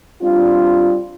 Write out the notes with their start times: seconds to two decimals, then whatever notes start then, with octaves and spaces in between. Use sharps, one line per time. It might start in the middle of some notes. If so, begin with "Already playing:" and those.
0.22 G3 C4 D4 F4